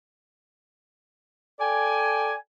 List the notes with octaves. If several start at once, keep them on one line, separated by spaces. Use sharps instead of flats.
A4 D5 G5 G#5